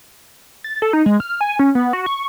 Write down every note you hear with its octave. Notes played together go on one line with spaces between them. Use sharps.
A6
A4
D#4
G#3
F6
G#5
C#4
B3
F#4
C#6